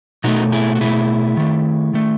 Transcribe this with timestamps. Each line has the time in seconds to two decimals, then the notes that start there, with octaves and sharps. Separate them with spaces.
0.24 B2 A3 D#4 F#4
0.52 E4 G#4
0.75 F#4
0.81 B2 A3 E4 G#4
1.37 D#3 A3
1.93 D#3 A3